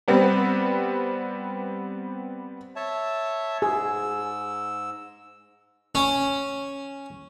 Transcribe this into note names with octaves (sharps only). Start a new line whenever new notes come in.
G3 B3 C4
C#5 E5 A5
G#2 G#4 E6
C#4